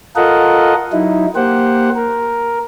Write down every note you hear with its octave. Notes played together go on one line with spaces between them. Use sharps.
F4 A4 A#4 D#5 F#5
F#3 D#4 E4
A#3 G4 C5 F#5
A#4